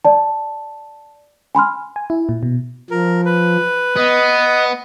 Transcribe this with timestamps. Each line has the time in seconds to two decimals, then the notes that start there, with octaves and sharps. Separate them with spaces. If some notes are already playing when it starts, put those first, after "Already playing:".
0.05 D5 A5
1.55 G#5 B5 C6 F6
1.96 G#5
2.10 E4
2.29 A#2
2.43 B2
2.91 F3 A#4
3.25 B4
3.96 B3 D#5